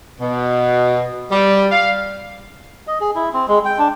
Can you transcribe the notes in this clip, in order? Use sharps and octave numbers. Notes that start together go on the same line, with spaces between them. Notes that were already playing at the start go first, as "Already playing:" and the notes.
B2
G3
F5
D#5
G#4
E4
C4
G#3
G5
D4